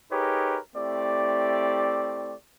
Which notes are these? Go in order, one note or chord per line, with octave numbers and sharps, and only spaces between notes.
D#4 G4 G#4 A#4 B4 C#5
A3 C4 E4 G4 D5